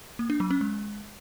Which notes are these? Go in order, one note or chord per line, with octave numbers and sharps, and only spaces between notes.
A#3
D4
F#3
C#4
G#3